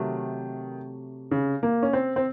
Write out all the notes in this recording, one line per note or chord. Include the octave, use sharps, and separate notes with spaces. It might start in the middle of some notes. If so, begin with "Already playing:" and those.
Already playing: C3 D#3 F#3 A3
C#3
A#3
C#4
C4
C4